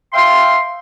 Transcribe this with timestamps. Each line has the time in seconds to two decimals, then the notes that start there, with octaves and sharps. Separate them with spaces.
0.13 E5 F5 G5 C6